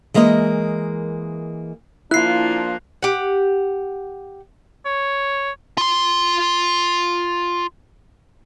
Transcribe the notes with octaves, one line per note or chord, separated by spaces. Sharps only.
E3 G#3 A#3 A#4 D#5
F3 A#3 D4 E4 F4 F#6 C7
G4 F#5
C#5
F4 C6